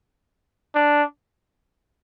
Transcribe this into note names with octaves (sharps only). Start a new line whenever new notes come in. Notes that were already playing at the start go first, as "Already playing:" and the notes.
D4